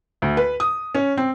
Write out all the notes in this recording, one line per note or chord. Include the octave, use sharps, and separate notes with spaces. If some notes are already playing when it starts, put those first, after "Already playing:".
D2
B4
D#6
C#4
C4